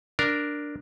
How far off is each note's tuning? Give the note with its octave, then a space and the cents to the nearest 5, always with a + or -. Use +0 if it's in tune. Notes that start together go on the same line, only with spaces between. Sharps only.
D4 +0 A#4 +0